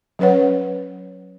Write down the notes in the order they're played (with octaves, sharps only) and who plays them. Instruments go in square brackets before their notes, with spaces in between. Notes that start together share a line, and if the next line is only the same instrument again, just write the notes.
[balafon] F#3 C#4 B4 C#5 F#5